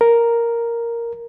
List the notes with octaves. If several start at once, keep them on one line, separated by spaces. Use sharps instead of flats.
A#4